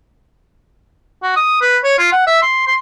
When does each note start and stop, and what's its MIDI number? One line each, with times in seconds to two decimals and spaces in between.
1.23 1.36 66
1.36 1.60 87
1.62 1.78 71
1.84 1.96 73
1.98 2.08 65
2.12 2.26 78
2.27 2.40 76
2.42 2.64 84
2.67 2.75 84